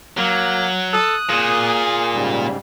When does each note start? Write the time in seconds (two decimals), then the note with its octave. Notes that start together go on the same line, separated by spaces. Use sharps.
0.18 F#3 A#3
0.93 A4 D#6 F#6
1.30 A#2 G#4
2.14 G#2 C#3 G3